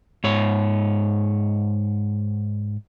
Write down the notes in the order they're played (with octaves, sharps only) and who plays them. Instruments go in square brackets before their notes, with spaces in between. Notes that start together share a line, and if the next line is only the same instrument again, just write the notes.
[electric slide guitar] G#2 C#5